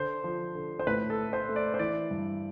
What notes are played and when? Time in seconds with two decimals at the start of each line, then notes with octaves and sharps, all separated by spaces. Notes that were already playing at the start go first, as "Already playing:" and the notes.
Already playing: D3 C5
0.24 F3
0.55 D3
0.79 C5
0.87 A2 B4
1.10 A4
1.18 A3
1.33 C5
1.49 A3
1.56 D5
1.74 C5
1.79 E3 D5
2.11 G2